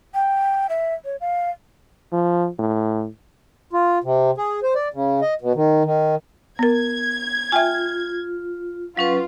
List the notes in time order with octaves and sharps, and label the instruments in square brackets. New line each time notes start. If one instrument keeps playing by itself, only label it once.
[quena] G5
E5
C#5
F5
[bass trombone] F3
A2
[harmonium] F4
C3
G#4
C5
D5
C#3
D#5
B2
D#3
D#3
[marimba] B3 A#4 [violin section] G#6
[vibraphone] F4 [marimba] E5 G5 G#5
[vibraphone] F#3 C#4 B4 [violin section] F4